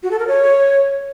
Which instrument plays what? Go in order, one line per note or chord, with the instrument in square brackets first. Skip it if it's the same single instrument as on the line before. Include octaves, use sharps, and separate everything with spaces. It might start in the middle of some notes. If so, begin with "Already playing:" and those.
[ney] F#4
A4
A#4
C#5